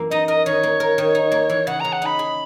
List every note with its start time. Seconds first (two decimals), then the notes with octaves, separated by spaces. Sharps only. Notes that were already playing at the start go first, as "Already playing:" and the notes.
Already playing: F#2 E3 A#3
0.11 D#4 D#5
0.28 A#4 D#5
0.46 D#3 C#5
0.63 A#3
0.80 A#4
0.98 D#3
1.15 D#4
1.32 A#3
1.50 E3
1.67 C#3 F#5
1.80 C#3 A#5
1.93 F#5
2.02 D#4 B5
2.19 G#4